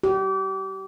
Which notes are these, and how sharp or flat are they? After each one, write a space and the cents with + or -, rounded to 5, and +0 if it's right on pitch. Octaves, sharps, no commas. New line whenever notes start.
G4 -30